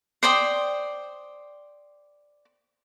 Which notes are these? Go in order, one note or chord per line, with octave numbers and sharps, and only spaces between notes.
C5 D5 G5 D#6